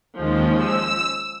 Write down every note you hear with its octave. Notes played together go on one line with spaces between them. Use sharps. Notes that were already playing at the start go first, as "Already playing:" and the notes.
D#2 F3 G#3 C#4
E6